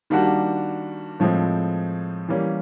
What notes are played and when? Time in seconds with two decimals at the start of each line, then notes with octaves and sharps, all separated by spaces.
0.10 D#3 G3 A#3 D4 F#4
1.20 A2 F3 G#3 C4
2.29 E3 G3 A#3 C#4